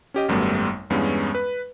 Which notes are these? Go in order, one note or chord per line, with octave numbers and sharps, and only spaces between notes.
C#4 G4 D#5
G#1 F#2 G3 A3 B3
E2 G2 G#3 B3 C#4
B4